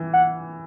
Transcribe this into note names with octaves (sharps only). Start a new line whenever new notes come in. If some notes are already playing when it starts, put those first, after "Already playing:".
Already playing: E3
F#5